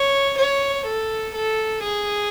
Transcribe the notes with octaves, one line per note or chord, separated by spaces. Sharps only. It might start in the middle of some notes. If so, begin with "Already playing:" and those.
Already playing: C#5
C#5
A4
A4
G#4